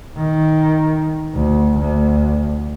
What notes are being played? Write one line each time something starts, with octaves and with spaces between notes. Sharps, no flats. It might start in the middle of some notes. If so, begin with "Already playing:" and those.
D#3
D2
D2